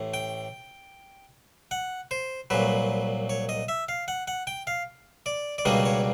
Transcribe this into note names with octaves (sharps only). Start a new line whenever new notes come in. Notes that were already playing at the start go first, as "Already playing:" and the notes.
Already playing: A1 A2
G5
F#5
C5
C2 A#2 F#3 B4
C#5
D#5
E5
F5
F#5
F#5
G5
F5
D5
D5
C#2 B2 G3 A#3 D4 D#5
C#5